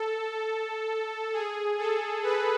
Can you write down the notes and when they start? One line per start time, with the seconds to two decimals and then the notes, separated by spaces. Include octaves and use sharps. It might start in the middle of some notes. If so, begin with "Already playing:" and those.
Already playing: A4
1.33 G#4
1.78 A4
2.23 B4